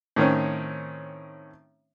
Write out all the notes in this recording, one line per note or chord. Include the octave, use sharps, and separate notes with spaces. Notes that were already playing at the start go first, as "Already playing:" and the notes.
A2 D#3 C4 C#4